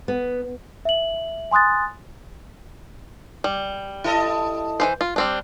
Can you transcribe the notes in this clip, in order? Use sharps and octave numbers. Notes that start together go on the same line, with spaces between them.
B3
E5 F#7
G#5 C6 D#6 F#6 A6
G3
E4 A4 D#5
E3 F3 C5
F4
G3 C4 D4